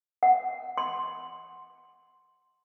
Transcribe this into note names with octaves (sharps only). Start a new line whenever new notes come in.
F#5
C6